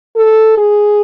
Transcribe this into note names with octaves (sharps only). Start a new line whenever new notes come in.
A4
G#4